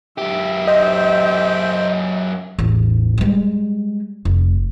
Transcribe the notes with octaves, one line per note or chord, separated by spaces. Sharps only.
F#2 G4 E5
C5 D#5 G5
A1 E2
G3 G#3
F1